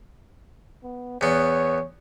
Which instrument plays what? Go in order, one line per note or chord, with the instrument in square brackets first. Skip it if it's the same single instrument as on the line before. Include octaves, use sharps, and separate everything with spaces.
[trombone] B3
[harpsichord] E2 B3 [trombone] C#5